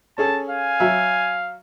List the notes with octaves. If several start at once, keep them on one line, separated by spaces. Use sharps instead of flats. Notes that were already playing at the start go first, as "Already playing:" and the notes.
C#4 G#4 A4 A5
F5 G#5
F#3 E5